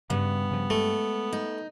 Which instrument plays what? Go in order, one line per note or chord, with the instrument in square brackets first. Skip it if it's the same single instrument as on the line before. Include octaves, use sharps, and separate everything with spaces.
[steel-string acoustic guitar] G2 [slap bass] C#3 [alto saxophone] B3
[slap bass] C#3 F3
[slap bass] G#3 [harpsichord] A3
[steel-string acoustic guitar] D#4